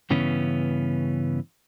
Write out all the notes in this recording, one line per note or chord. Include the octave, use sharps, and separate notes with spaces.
G2 C#3 E3 B3 C#4